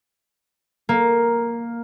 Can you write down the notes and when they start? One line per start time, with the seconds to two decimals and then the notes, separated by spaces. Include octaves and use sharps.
0.89 A#3